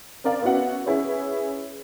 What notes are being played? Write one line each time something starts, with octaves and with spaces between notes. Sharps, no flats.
C4 A#4 D5 F5
B3 C#4 E4 F#4 F#5
C#4 E4 G#4 B4 C#5